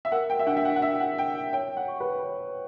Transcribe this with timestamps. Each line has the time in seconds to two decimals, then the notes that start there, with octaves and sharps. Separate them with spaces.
0.05 E5
0.12 A#4 F#5
0.30 G5
0.39 E5
0.47 D4 F#5
0.57 E5
0.65 F#5
0.76 F#5
0.82 D4 E5
1.00 F#5
1.18 E5 G5
1.53 C#5 G5
1.77 F#5
1.88 C#6
2.00 B4
2.24 C#5